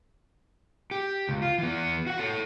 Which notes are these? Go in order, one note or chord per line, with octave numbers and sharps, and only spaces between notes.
G4
C#2
F4
E3 B3
F#4 F#5
A4 C#5